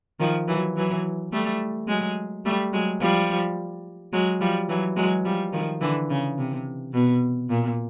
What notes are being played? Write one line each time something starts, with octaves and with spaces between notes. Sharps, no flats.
D#3 F3
E3 F#3
E3 F#3
G3 A3
F#3 G#3
G3 A3
F#3 G#3
F3 G3
F#3 G#3
F3 G3
E3 F#3
F#3 G#3
F3 G3
D#3 F3
D3 E3
C#3
C3
B2
A#2